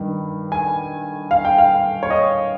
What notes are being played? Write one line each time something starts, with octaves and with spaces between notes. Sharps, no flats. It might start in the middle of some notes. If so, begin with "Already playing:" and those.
Already playing: G2 D#3
G#5
F5
G5
F5
C#5
D#5